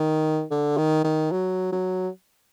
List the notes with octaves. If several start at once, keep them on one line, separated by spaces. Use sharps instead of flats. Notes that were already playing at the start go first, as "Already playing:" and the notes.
Already playing: D#3
D3
D#3
D#3
F#3
F#3